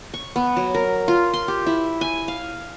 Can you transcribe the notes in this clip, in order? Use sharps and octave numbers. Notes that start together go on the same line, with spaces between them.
C#6
B3
F#3
A#4
F4
C6
G4
E4
G#5
F5